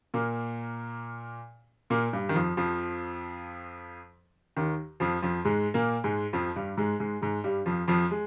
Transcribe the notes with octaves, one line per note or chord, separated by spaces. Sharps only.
A#2 A#3
A#2 A#3
G2 G3
D#3
F2 F3
F2 F3
D#2 D#3
F2 F3
F2 F3
G#2 G#3
A#2 A#3
G#2 G#3
F2 F3
G2 G3
G#2 G#3
G#2 G#3
G#2 G#3
G2 G3
F2 F3
F2 F3
G#3